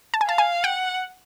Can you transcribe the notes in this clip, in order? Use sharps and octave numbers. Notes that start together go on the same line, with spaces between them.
A5
G#5
F5 A5
G#5
F#5 G5